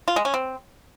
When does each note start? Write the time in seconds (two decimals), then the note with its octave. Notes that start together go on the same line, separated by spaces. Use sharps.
0.08 F4
0.16 G#3
0.25 C#4
0.34 C4